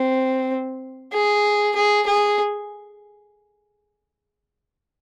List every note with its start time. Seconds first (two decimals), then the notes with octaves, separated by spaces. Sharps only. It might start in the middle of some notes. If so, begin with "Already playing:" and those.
Already playing: C4
1.13 G#4
1.76 G#4
2.07 G#4